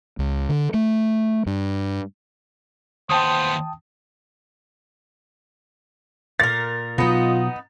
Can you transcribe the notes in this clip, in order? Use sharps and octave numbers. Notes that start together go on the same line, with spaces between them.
C#2
D3
A3
G2
D#2 B3 C5 G5 A5 D#6
A#2 A#4 A6
B2 F#3 B3 D#4 F4